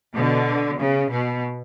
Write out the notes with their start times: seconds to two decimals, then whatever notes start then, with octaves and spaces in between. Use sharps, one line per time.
0.15 B2 D3
0.78 C#3
1.10 B2